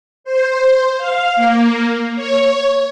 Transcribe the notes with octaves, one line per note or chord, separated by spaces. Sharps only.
C5
F5
A#3
C#5